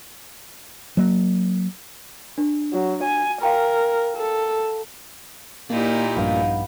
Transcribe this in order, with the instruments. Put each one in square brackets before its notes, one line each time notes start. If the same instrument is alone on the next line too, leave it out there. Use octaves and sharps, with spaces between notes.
[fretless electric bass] F#3 A#3
[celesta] D4
[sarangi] F#3
G#5
[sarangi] A#4 [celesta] F5 G5 A#5
[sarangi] A4
[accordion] A#2 [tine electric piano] A#3 [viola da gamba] D#4 E4 G4
[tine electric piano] A#1 G2 [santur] B3 F5 G5